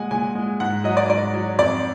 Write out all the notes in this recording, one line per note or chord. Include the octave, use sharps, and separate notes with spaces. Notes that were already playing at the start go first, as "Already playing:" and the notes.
Already playing: A#2 G#3 F#5 G#5
A#2 G#5
G#3
G#2 F#5
F#3 D#5
D5
G#2 D5
F#3
F2 D5